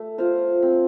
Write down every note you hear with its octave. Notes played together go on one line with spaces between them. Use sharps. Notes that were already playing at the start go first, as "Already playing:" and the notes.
Already playing: A3
F4 C5 F5
C4